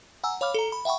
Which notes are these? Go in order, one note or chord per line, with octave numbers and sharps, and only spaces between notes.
F#5 G#5 A#5 E6
C#5 F5 B5 D6 F6
A4 A#5
B5
E5 F#5 G5 B5 C#6